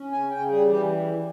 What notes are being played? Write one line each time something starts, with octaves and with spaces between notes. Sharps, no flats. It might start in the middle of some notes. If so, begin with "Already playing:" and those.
Already playing: C#4
C#3 G#5
C#3 G5
G3 G#4
E3 G4